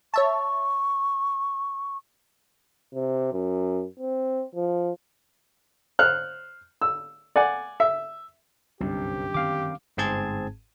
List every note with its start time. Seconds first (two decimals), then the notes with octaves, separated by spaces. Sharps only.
0.14 C#5 E5 A5 C#6
2.94 C3
3.32 F#2
4.00 C4
4.55 F3
5.99 C5 F6 F#6
6.82 E6
7.36 D5 F#5 G#5
7.80 E5
8.81 G1 C2 F#2 G4
9.34 D#3 C4 F5 D6
9.97 G1 G#2 C4 G#4 A5 G#6